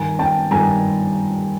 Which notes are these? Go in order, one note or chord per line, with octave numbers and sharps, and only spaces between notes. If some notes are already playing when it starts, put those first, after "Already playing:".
Already playing: G2 D#3 G#5 A#5
G5 A5
G2 D#3 G#5 A#5